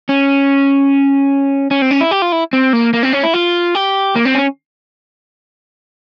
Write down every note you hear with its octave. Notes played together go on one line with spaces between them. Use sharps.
C#4
C#4
C4
C#4
E4
G4
F4
E4
C4
A#3
A#3
C4
C#4
E4
F4
G4
A#3
C4
C#4